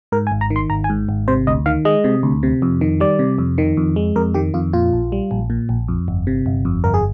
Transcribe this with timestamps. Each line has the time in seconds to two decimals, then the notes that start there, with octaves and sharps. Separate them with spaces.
0.12 G#2 A#4
0.27 G#5
0.32 G#1
0.41 A#5
0.50 D#3
0.56 C6
0.70 G#1 A#5
0.84 G#5
0.90 G#2
1.09 G#1
1.28 C3 C5
1.47 D2 D#5
1.66 D#3 F5
1.85 G#3 D#5
2.04 C3
2.23 D2
2.43 C3
2.62 F2
2.81 D#3
3.00 G3 D5
3.19 C3
3.38 F2
3.58 D#3
3.77 F2
3.96 G#3
4.16 F2 A#4
4.34 D#3 G4
4.54 F2 F4
4.73 A#2 F4
4.93 A#1
5.12 G3
5.31 A#1
5.50 A#2
5.69 A#1
5.88 F2
6.08 G1
6.27 C3
6.46 G1
6.65 F2
6.84 G1 A#4
6.94 G#4